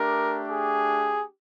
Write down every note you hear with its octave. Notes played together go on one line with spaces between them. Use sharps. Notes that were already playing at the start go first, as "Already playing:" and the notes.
Already playing: A3 D4 G4 A#4
G#4